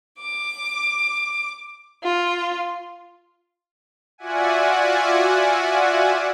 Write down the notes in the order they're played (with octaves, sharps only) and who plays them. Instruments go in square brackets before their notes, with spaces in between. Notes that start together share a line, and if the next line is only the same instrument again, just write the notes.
[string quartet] D6
F4
[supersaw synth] F4 F#4 D5 E5 F#5 G#5